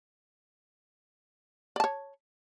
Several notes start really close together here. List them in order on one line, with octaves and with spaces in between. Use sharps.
D5 A5 C#5